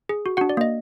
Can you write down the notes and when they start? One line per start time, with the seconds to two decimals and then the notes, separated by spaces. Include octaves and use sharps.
0.09 G#4
0.26 F#4
0.37 F#4 F#5
0.41 D4
0.49 D5
0.57 A#3 D#5